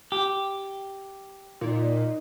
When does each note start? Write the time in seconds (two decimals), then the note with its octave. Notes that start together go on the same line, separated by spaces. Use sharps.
0.12 G4
1.61 A#2 D#4